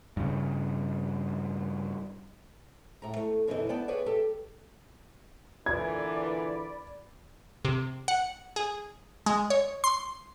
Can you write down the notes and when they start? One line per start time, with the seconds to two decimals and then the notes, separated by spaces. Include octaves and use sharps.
0.17 G2 C#3
3.02 A2 A#5
3.16 A3
3.47 F#2 B2 D3 E3 D4 D#4
3.69 B3 D5 G5 A5
3.88 G#4 B4 C#5 D5
4.06 G4 A4
5.66 A#2 D3 E3 D5 B5 G#6
7.65 C3
8.08 F#5
8.56 G#4
9.26 G#3
9.50 C#5
9.84 C6